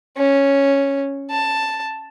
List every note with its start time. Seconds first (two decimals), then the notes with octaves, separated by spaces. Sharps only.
0.17 C#4
1.31 A5